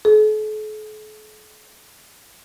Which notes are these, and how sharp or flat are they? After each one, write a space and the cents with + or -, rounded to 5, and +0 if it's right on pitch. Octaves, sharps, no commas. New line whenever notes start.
A4 -45